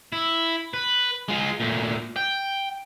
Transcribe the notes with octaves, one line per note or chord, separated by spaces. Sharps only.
E4
B4
G#3 F4
A#2 A3
G5